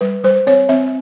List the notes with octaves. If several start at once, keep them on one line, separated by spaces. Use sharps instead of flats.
G3 B4
G3 C5
C4 C#5
C4 E5